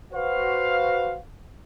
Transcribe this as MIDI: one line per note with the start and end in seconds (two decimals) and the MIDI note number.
0.13 1.18 66
0.13 1.18 71
0.13 1.18 72
0.13 1.18 77